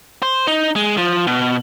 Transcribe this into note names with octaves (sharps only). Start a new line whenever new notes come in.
C5
D#4
G#3
F3
B2